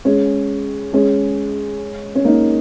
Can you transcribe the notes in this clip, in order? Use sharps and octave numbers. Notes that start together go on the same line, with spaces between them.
G#3 C#4
G#3 C#4
C#4
A#3 D#4